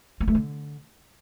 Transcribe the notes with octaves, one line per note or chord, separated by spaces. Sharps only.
A#3
A3
D3